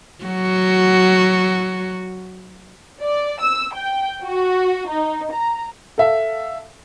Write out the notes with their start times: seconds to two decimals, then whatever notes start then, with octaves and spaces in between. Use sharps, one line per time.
0.24 F#3 F#4
3.01 D5
3.41 E6
3.74 G5
4.23 F#4
4.89 D#4
5.32 A#5
5.98 A4 E5 F5